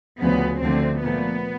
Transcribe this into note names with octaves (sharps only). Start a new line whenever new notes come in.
D2 C#3 F3 B3
D2 D3 F3 A3 C4
A#2 F3 A3 B3